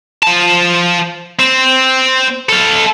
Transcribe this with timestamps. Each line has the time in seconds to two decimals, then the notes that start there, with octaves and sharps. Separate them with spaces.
0.23 F3 A5
1.39 C4
2.49 A4 F5